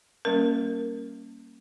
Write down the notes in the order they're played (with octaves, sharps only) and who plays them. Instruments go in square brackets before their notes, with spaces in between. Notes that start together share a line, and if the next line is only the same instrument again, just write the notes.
[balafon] G3 A#3 C#4 A#4